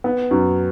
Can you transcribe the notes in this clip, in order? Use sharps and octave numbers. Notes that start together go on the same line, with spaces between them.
B3
F#2